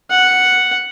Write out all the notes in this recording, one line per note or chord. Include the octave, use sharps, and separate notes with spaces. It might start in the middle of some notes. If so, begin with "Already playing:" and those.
F#5